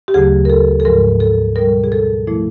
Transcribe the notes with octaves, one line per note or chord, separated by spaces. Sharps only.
G4
D2 C#3 F#3 A3 G#4
A#4
A4
A4
G#2 F3 G#3 A#4
A4
B2 G3 A#4
G#4
A4
A#2 F3 A3 E4